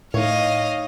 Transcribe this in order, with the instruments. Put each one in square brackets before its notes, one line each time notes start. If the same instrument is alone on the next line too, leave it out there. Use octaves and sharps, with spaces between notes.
[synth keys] A2 [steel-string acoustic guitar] D#4 C#5 [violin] D#5 F5